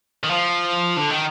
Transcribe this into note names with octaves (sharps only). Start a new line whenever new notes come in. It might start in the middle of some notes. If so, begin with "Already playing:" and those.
D#3
F3
D3
D#3